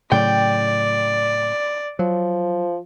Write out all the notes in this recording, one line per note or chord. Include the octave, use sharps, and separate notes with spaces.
A2 C#3 F#3 D5 G5
F3 F#3